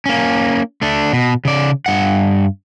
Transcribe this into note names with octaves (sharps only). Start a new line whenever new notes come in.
A#3 C#4
A3 D4
B2
C#3 D5
G2 F#5